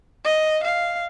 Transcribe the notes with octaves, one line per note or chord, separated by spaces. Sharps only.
D#5
F5